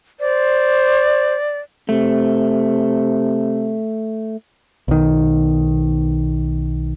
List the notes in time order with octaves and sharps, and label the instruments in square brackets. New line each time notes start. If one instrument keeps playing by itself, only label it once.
[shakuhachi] C5 [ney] D5
[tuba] C3 [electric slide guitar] A3
[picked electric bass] B1 D#3